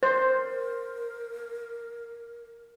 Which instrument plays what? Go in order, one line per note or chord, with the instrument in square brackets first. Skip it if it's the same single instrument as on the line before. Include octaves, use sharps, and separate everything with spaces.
[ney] A#4 [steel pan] C5